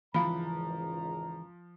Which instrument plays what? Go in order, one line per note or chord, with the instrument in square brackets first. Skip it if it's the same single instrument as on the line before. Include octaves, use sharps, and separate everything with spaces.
[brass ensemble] G#1 C#2 A#5 [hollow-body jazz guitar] E3 [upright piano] F3 [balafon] F5 B5